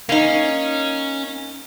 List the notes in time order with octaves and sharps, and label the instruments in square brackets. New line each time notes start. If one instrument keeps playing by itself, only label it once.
[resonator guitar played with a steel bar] A#3 D#4 [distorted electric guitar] C#4